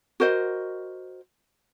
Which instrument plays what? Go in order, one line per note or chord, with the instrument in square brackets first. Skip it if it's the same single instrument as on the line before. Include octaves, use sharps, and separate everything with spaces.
[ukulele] F#4 A#4 C5 D#5